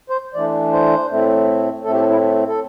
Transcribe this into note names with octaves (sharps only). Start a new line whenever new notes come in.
C5
E3 A3 D4 D5
C5
A2 A3 C4
A2 A3 C4 A4
G4
A4
E4
A4